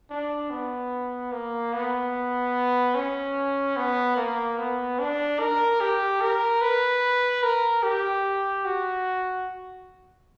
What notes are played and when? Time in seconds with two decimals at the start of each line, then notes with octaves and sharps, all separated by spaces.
0.10 D4
0.50 B3
1.32 A#3
1.73 B3
2.95 C#4
3.76 B3
4.17 A#3
4.58 B3
4.99 D4
5.39 A#4
5.80 G4
6.21 A#4
6.61 B4
7.43 A#4
7.83 G4
8.65 F#4